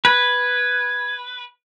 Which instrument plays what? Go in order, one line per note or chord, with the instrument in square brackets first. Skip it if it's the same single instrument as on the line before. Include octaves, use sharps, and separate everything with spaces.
[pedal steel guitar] B4 [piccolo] G#6